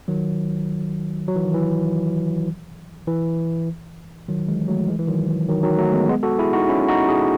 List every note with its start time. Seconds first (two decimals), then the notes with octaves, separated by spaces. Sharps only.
0.08 D#3 F#3
1.28 F#3
1.36 E3
1.44 D#3
1.54 E3
3.08 E3
4.28 D#3 F#3
4.48 E3 G#3
4.68 F#3 A3
4.88 E3 G#3
4.99 E3
5.08 D#3 F#3
5.28 E3
5.48 D#3 F#3
5.63 D#3 F#3
5.78 F#3 A3
5.93 G#3 B3
6.09 G#3 B3
6.23 F#4 A4
6.39 E4 G#4
6.53 D#4 F#4
6.69 C#4 E4
6.88 D#4 F#4
7.09 E4 G#4